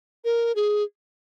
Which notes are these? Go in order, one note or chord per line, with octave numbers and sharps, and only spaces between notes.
A#4
G#4